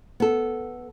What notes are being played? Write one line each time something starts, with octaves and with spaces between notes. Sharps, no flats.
B3 A4